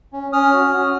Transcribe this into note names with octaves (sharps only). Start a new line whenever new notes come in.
C#4
C#4 D#6 F6
F#4
F#4